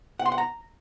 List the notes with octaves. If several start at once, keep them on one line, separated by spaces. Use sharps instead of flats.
F#5
C6
F#5
A#5